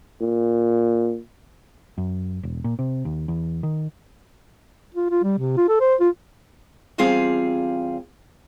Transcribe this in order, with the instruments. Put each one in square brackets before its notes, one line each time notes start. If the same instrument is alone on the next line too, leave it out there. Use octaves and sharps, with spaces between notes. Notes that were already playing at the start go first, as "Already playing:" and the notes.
[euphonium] A#2
[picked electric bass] F#2
E1
A#2
C3
D#2
E2
D#3
[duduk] F4
F4
G3
C3
F4
A4
C5
F4
[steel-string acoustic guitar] E2 G3 C4 F4 G#4 F5